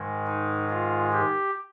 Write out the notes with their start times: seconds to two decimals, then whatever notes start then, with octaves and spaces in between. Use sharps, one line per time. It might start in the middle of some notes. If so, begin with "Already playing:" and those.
Already playing: G#2 D#3 G#3
0.27 D#4
0.70 F4
1.12 G4